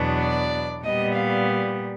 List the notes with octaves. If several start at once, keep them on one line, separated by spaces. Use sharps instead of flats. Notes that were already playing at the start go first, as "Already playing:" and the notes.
Already playing: E2 B2 F#3 B3 D4
D5
A#2 G3 B3 D#5
F5